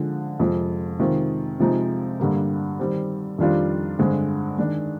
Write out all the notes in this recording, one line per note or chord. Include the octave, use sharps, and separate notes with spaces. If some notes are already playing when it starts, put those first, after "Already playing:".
Already playing: D3 F3 G#3
F2 C3 F3 G#3
C3 D#3 G#3 C4 F4
C3 F3 G#3 D#4
G2 D3 G3 A#3
D#3 G3 C4
F2 D#3 G3 D4 F4
G2 D3 G#3 C4
D#3 G#3 D4